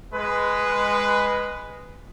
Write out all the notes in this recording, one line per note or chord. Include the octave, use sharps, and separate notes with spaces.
G#3 B4